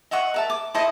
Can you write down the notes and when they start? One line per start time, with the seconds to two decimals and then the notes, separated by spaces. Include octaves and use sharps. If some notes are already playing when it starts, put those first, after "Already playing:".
0.11 D#5 E5 F#5 C#6
0.34 A#4 E5 A5
0.50 D6
0.74 E4 A4 C5 D#5